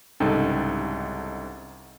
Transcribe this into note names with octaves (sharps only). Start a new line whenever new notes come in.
C2 G#2 C#3 D#4 A4 G5